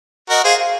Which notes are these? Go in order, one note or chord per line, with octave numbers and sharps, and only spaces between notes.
F#4 A#4 D#5
G#4 C5 F5
F5